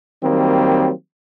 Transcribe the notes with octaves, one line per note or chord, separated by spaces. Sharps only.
D#3 F#3 G3 A#3 C4